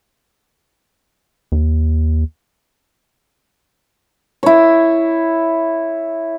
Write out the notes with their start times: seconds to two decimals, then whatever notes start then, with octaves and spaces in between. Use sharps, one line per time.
1.52 D#2
4.43 E4 C#5